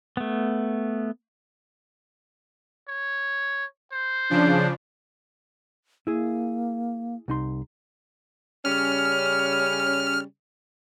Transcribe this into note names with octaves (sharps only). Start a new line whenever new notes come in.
A3 B3
C#5
C5
C#3 F3 D4
A#3 E4 G#4
C2 D#4 C6
C#3 G3 C#4 F6